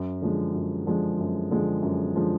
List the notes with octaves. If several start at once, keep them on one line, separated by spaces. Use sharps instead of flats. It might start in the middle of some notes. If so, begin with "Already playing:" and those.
Already playing: F#2
D3 F3 G#3
F#2
D3 F3 G#3
F#2
D3 F3 G#3
F#2
D3 F3 G#3